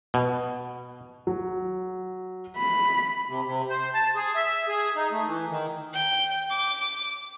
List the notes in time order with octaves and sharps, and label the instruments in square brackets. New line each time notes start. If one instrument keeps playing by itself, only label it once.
[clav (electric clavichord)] B2
[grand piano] F#3
[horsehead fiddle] B5
[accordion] C3
C3
C5
A5
G#4
E5
G#4
D#4
A3
E3
D#3
[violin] G5
D6